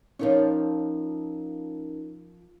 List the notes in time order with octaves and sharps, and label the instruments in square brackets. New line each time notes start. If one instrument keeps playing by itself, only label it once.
[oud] F3 F4 C#5 [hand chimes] C#4 D#4 A#4